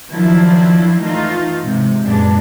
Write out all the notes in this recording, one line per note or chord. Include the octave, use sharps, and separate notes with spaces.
D#3 F3 F#3 D4 E4 F4
E3 A3 D#4 F4
G#2 C3
F#2 A#2 G#3 B3 D4